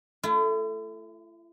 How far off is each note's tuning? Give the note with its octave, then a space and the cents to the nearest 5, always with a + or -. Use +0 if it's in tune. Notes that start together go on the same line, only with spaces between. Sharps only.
A3 +0 E4 +45